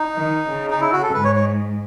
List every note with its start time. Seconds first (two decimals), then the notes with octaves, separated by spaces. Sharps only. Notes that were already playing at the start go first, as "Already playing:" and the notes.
Already playing: D#4
0.15 D#3
0.48 C#3
0.70 D#4
0.81 E4
0.92 F#4
1.02 A4
1.14 G#2 B4
1.24 C#5
1.36 C#5